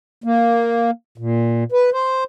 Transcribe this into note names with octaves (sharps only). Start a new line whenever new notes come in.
A#3
A#2
B4
C5